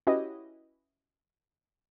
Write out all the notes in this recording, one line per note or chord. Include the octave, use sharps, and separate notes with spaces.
C#4 E4 F#4 G4 B4 D#5